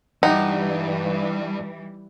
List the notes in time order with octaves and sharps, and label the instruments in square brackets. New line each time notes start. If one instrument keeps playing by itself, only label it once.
[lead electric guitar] E2 G2 [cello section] E3 G3 [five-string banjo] D#4 [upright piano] F#5 G5